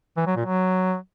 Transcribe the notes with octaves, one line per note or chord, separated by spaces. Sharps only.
E3
F#3
A#2
F#3